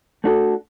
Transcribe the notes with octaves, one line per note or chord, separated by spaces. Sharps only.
A3 D4 F#4 A4